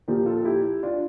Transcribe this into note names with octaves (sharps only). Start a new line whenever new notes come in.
A#2 F3 G4 A#4
F4 A4
A4
E4 G4
D4 F4